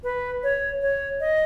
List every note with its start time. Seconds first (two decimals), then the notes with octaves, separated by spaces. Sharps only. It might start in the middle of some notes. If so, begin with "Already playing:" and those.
0.03 B4
0.43 C#5
0.82 C#5
1.20 D#5